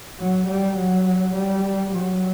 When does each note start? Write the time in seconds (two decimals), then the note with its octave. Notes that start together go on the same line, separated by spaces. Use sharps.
0.20 F#3
0.48 G3
0.77 F#3
1.35 G3
1.93 F#3